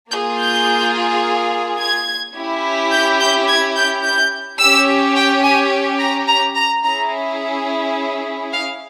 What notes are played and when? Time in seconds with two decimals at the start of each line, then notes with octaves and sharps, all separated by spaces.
0.11 A#3 F4 G#4 G6
0.40 G6
1.79 G#6
2.35 C#4 E4 G4
2.92 G6
3.19 G6
3.48 G#6
3.75 G6
4.04 G6
4.59 C#4 G4 E6
5.16 G5
5.43 G#5
5.99 A#5
6.28 A#5
6.56 A#5
6.85 C#4 E4 G#4 A#5
8.52 F5